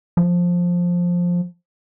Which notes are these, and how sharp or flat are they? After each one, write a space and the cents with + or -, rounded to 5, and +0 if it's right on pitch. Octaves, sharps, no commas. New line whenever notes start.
F3 +10